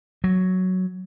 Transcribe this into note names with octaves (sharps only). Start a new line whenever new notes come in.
F#3